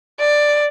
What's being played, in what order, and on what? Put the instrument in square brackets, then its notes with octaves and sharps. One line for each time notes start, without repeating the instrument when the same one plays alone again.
[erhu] D5